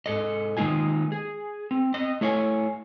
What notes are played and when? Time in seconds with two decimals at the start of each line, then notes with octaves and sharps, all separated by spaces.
0.06 G#2 A4 D#5
0.57 D#3 G#3 A#3 D#4 F4 G#5
1.12 G#4
1.71 C4
1.94 C4 D#5
2.21 A3 E4 C#5 F5 G#5